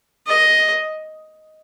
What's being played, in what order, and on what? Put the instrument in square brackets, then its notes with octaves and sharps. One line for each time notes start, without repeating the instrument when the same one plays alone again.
[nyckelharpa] D#5